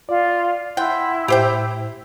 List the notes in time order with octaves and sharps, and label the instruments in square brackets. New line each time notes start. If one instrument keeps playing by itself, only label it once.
[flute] F4 [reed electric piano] D5
[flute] E4 [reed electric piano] F#5 C6 [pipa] G5
[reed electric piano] A2 E5 [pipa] G4 C5 G5